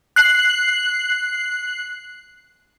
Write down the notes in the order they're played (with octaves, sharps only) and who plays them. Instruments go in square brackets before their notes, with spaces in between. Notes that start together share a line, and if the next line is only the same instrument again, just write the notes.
[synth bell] F#6 C7 F#7